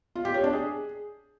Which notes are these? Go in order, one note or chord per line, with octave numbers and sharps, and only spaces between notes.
F4
G4
C#5
D4
G#4